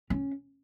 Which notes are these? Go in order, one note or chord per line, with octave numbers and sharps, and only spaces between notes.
C#4